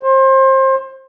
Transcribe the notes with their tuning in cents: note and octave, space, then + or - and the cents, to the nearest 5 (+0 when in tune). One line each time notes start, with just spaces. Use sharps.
C5 +30